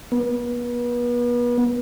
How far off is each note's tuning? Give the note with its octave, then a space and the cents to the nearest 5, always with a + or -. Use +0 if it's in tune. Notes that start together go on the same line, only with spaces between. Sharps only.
B3 -35